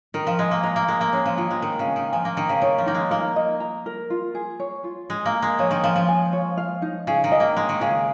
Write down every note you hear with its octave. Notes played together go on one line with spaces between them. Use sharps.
D#3 A#4
F3
G#3 D#5
A#3
G#3 A#5
A#3
G#3 A#4
A#3
G#3 C#4
F3
D#3 F4
G#3
D#3 A#4
C#3
C#4
D#3
F3 G#5
A#3
D#3 A#4
C#3
D#3 C#5
F3
A#3 D#4
G#3
A#3 A#4
D#5
A#5
A#4
F4
G#4
C#5
F4
G#3 G#5
A#3
A#4
G#3
F3 C#5
D#3
F3 C#4
F3
G#5
C#5
F5
D#4
C#3 G#4
D#3
D#5
A#3
G#3 A#5
D#3
C#3 G#4